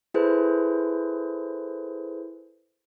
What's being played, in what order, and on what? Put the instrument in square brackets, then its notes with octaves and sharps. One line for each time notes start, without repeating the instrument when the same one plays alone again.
[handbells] E4 G#4 A4 B4 C5